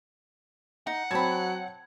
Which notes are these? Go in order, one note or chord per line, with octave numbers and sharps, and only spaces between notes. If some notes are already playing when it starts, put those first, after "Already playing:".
D#4 F#5
F#3 C4 A5 B5 G#6